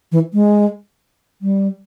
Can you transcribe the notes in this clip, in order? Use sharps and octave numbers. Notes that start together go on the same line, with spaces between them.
E3
G#3
G3